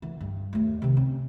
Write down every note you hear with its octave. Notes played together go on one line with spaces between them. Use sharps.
D3 E3
G2
D#2 A3
C3 D#3
C4 C#4